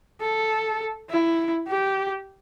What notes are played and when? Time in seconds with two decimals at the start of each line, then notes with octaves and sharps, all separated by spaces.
0.21 A4
1.10 E4
1.68 G4